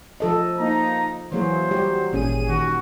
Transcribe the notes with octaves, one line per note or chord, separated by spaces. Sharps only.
F3 A4 D#5
A#3 D#4 A#5
E3 F#3 A#3 G#4 C5
G3 G4
G#1 A#2 C#4 G#4 D#7
D#3 F#4